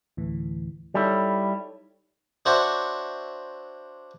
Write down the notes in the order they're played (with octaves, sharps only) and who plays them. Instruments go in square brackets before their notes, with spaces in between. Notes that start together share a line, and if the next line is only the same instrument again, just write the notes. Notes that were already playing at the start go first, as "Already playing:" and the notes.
[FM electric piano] D2 A2 E3
[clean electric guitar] G3 E4 [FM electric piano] D#4 A4 C#5
[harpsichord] D4 F#4 C5 C#5 E5